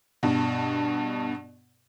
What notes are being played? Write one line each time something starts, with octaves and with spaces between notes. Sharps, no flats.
G2 B2